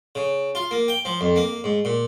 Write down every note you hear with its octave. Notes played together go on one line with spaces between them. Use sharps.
C#3
F4
A#3
G5
F3
F2
A#3
G#2
A#2